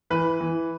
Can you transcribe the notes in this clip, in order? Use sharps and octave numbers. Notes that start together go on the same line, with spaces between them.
E3 B4
E3